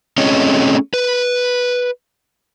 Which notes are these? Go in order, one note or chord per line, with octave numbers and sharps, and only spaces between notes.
A3 C4 C#4 G#4 C#5 D#5
B4